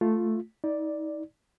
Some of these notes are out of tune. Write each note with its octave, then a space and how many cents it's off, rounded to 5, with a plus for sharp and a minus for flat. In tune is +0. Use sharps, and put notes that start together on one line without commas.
A3 +0 F4 +0
D#4 +35 D5 +0